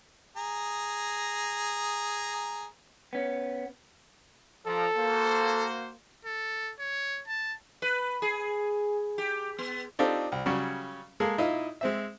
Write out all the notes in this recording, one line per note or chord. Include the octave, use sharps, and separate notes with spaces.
G#4 A#5
B3 C#4
F3 A4 D5 A#5
A#3 F#4 C5
A4
C#5
A5
B4
G#4
G4
B3
C4 D4 D#4 F4 G4 A4
C2
C#3 F#3 G3 C#4
G#3 A#3 G#4 A4
A#2 D#4 E4 D#5 F5
G#3 C4 E5